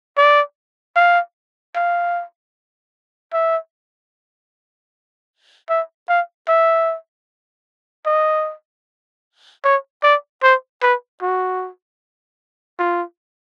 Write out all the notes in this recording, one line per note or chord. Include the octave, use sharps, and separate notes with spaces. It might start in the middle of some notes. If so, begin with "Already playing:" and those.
D5
F5
F5
E5
E5
F5
E5
D#5
C#5
D5
C5
B4
F#4
F4